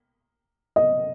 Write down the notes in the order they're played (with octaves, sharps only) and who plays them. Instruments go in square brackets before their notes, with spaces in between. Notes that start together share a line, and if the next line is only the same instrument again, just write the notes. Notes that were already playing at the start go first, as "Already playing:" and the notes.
[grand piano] D#5